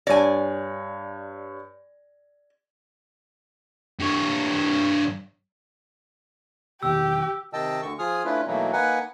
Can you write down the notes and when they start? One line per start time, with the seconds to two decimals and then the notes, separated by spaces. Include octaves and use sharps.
0.07 G2 C#5 D5 G#5 A#6
4.00 G2 C#5
6.83 B1 E2 D#3 G4 G5 E6
7.53 C3 D#3 D#5 G5 A5 E6
7.82 D2 D3 C#6
7.99 F3 F4 G#4 G#5 D#6 F6
8.25 A3 C#4 D4 E4 F4 B4
8.47 B2 E3 F#3 A3 A#3 D#4
8.73 A#3 D#4 B4 F#5 G#5